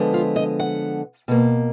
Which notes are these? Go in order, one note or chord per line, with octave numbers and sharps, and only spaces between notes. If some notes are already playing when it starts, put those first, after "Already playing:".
Already playing: D3 F3 G#3 B3
F4
D#5
F#5
B2 A#3